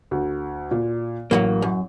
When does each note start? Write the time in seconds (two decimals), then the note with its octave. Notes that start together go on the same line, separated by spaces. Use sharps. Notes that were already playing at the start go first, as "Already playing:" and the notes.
0.11 D2
0.71 A#2
1.31 A1 F#3 G#3 A#3
1.62 F#2